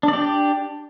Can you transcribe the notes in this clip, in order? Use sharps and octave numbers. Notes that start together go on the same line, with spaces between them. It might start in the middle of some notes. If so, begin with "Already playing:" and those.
D4 G4 D5